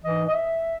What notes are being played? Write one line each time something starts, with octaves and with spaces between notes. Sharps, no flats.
G#2 E3 D#5
D#5
E5